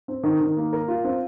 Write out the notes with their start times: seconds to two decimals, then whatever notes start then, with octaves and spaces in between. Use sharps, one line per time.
0.08 C4
0.23 D#3
0.41 D#3
0.57 A#3
0.73 A#4
0.88 F4
1.04 C4